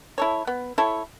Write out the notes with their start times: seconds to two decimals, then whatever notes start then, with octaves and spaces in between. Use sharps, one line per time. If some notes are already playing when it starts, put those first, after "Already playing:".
0.18 E4 A4 C#5
0.47 B3
0.78 E4 A4 C#5